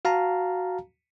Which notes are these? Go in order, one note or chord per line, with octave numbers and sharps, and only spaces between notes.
F#4 F5 A5 A#5